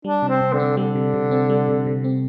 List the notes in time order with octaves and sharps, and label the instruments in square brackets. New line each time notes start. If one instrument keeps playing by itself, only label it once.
[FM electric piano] G3 [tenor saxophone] D4
[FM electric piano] C3
[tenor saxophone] C4
[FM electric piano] C3
[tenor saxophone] D3
[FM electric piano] C4
[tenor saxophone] D3 [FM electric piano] G3
[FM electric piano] C3
C3
C4
G3
C3
C3
C4